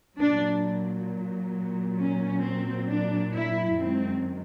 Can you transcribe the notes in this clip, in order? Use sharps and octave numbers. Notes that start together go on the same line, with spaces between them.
A#2 F#3 D4
C#4
C4
D4
E4
F#2 D#3 G#3 C4